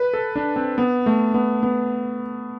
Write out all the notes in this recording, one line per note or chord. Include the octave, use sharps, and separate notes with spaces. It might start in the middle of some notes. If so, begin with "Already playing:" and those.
Already playing: B4
A4
D4
C4
B3
A3
B3
B3